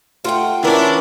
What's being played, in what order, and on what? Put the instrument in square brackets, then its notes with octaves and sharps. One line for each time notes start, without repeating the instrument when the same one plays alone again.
[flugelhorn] A3 [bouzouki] F4 F#5 G5
[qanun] E3 C#4 [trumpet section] D4 E4 [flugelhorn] A#4